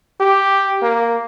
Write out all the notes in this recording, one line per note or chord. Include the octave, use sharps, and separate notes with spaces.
G4
A#3